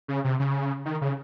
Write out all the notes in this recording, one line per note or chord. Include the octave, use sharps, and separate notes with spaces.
C#3
C3
C#3
D#3
C#3